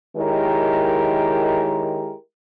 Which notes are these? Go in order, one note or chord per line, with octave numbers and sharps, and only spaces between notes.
D#3 G#3 E4 G4 A#4 C#5